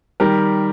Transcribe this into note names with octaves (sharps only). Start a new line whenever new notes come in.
D#3 G3 G4 A#4